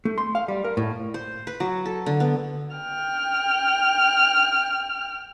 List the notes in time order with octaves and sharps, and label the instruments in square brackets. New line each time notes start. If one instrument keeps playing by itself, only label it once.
[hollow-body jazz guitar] A3
C6
F5
G3
A#4
A2
[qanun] C5
B4
F#3
A4
D3
B3
[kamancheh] G5 F6